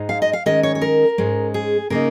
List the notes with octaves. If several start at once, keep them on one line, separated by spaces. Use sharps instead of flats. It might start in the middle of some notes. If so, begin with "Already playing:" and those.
Already playing: G#2 G#3 D#4
F5
D#5
F5
D#3 G#3 C#4 D#5
C#5
C#5
A#4
G#2 G#3 C#4
G#4
C#3 A#3 D#4 A#4